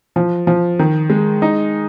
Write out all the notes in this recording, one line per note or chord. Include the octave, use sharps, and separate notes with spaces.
F3
F3
D#3
G#3
D#4